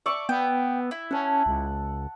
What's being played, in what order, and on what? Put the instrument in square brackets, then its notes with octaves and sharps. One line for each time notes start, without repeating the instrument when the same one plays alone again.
[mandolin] D5 C#6 [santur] E5 D6
[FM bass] B3 [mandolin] G5
[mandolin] E4
[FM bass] C#4 [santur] F#5 A5
[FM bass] C#2